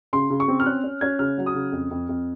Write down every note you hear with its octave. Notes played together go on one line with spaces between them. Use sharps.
C#3 C6
C#3
C#6
C4
F6
C#4 F#6
C#4
C#4 G#6
C#3 F6
F#3
D#6
C#3
F2
F2
F2